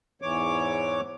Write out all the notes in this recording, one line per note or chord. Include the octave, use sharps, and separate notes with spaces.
E2 G#2 E3 C#5 D6